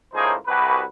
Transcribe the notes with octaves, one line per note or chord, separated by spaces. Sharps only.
C#2 A2 A#3 D#4 G#4 C5
C2 F#4 B4